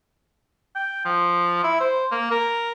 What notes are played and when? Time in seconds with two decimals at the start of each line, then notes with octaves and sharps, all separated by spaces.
0.75 G5
1.05 F3
1.63 E4
1.80 C5
2.11 A#3
2.31 A#4